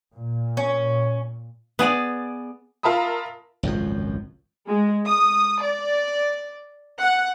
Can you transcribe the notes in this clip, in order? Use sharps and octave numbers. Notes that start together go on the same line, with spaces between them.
A#2
C#4
B3 G#4 D5
F4 A#4 E5 A5 B5 D#6
G#1 C#2 F#2 F3
G#3
D#6
D5
F#5